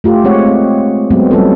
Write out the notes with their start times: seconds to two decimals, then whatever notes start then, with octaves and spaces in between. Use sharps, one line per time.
0.04 A3 F4 G4
0.24 G#3 C4 C#5 F#5
0.47 C4
1.11 F#3 G#3 B3 C4
1.31 F#3 G3 C4 C#4 F4 A4